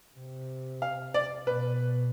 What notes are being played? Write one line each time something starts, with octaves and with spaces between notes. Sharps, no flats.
C3
F5
D5
B2 B4